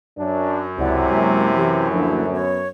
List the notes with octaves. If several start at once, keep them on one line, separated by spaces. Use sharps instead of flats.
F#2 D4
C#2 C3 E4 D5 F#5
F#3 G#3 A#3
E3 G4
D2 F3 A#3 D4
B3 C#5